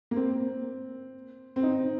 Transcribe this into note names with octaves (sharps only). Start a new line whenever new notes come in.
A#3
C4
C4
D#4